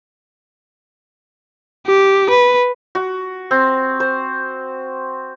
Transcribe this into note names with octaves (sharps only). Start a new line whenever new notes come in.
G4
B4
F#4
C4
C5